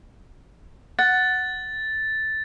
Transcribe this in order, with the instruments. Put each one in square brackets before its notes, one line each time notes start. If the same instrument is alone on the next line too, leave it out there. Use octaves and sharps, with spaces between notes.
[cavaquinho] F#5 [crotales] A6